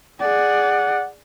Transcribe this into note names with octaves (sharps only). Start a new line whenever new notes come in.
G#4 D5 F#5